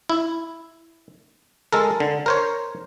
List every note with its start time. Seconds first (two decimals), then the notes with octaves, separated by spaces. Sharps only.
0.09 E4
1.73 G#3 A4 A#4
2.00 D3
2.26 A#4 C5 C#5